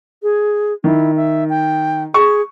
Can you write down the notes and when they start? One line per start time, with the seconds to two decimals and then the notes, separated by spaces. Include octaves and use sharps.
0.23 G#4
0.84 D#3 E4
1.16 E5
1.50 G5
2.14 G#4 C#6